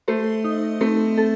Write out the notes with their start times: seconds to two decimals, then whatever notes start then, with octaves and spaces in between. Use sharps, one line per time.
0.08 A3 C5
0.44 D#4
0.81 A3 C4
1.17 A4